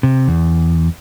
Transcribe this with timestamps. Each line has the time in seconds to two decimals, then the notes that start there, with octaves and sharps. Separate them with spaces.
0.03 C3
0.28 E2